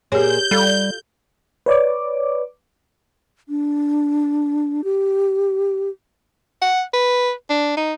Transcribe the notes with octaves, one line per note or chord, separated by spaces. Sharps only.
A#2 G4 G#4 C5 C#5 G6
G3 F4 A4
B4 C#5 D5 D6
D4
G4
F#5
B4
D4
D#4